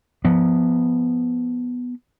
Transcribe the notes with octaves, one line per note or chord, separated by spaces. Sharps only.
F3 B3